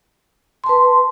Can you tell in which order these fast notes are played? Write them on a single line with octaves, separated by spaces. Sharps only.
C6 A5 B4